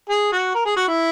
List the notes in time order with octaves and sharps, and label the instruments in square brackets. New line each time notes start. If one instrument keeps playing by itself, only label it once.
[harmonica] G#4
F#4
A#4
G#4
F#4
E4